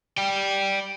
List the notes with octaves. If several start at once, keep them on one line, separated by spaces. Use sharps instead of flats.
D5 G5